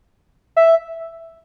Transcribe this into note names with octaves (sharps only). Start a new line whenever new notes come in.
E5